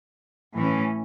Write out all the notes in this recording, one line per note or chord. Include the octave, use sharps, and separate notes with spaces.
A2 E3 C#4